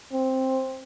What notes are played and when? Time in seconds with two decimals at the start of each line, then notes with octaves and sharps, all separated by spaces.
0.12 C4